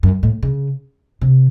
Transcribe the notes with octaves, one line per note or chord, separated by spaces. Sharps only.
F#2
A2
C#3
C3